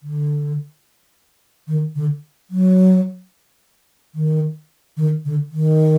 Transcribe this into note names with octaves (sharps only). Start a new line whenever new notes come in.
D3
D#3
D3
F#3
D#3
D#3
D3
D#3